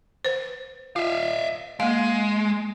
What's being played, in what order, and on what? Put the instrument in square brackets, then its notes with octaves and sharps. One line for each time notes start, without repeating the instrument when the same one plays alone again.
[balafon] B4 C5
[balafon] F4 [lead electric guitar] E5 F5
[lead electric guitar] G#3 [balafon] A#3 F5